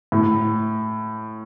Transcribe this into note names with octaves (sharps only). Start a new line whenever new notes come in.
A2